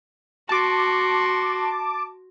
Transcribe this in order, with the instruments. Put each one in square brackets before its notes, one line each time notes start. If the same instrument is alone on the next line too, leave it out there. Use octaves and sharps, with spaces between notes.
[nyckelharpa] F#4 C6 [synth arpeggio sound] A5 D6